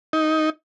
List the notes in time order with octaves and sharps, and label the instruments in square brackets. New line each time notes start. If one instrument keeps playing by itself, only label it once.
[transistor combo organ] D#4